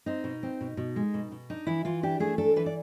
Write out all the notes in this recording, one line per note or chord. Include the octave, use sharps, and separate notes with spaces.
C4 D#4
B2
C4
B2
B2
G#3
B2
B2
D4 D#4
E3 E4
E3 F4
D4 G4
A3 G#4
D4 A4
E3 B4
D5